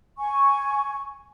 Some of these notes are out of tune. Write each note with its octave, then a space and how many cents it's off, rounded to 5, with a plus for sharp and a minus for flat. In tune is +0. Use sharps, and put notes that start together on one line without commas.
G#5 +0 C#6 +0